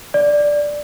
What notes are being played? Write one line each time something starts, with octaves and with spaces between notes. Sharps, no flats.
D5